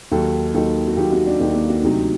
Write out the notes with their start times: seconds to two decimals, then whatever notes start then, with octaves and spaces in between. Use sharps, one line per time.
0.11 D#2 D#3 F#3 A4
0.54 D#2 D#3 F#3 A4
0.87 F#4
0.97 D#2 D#3 F#3 G4
1.12 F#4
1.26 D4
1.40 D#2 D#3 F#3 D4
1.54 A#3
1.69 F#4
1.83 D2 C3 F#3 D#4